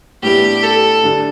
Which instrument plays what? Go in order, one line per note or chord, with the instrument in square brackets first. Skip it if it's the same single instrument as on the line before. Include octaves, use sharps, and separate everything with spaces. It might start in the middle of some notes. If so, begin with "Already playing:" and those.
[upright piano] A2 G3 B3 D4 [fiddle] G4
[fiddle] A4
[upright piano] D3 G3 D4